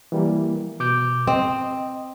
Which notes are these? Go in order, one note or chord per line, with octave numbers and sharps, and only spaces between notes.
E3 G3 A#3
B2 D6 G6
C4 D#5